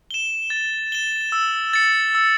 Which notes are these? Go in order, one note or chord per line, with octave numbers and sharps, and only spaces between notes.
E7 G7
A6
E7 G7
E6
A6 C#7
E6